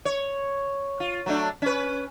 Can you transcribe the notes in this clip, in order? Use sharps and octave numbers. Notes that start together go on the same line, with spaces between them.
C#5
F4
F#3 A3 D4
C#4 B4